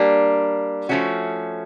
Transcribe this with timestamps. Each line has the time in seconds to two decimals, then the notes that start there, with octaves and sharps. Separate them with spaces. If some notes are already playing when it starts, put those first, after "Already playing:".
Already playing: G3 A#3 D4
0.89 F3 A3 C#4 F#4